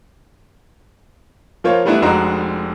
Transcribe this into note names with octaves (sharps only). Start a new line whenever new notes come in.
F3 A#3 F4 C5 C#5
E3 G3 A3 B3 D4 E4
F1 F2 G#3 D4 F#4 A#5